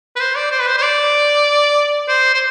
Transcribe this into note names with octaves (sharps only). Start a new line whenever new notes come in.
B4
C5
D5
C5
B4
C5
C5
D5
C5
C5